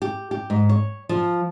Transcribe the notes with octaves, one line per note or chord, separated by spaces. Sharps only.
G4
G4
G#2
C#5
F3